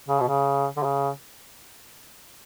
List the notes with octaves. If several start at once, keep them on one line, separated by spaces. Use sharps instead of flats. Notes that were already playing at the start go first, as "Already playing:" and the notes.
C#3
B2
C#3
D3
C#3